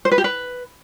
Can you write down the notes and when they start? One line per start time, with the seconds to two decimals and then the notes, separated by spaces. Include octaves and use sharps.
0.05 C5
0.12 B4
0.18 G4
0.24 B4